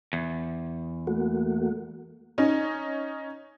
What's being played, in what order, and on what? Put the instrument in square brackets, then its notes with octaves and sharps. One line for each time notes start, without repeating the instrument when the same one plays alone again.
[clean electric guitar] E2
[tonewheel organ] A3 A#3 F#4
[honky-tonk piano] C#4 D#4 A#5